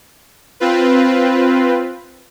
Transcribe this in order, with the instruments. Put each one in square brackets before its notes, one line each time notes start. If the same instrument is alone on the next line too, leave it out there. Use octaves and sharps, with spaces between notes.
[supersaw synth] C4 F4 B4